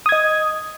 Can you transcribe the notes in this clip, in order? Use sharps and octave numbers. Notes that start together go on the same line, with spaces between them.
D#5 D#6 G#6